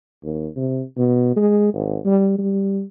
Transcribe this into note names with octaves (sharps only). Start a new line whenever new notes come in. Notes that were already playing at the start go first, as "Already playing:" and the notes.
D#2
C3
B2
G#3
G#1
G3
G3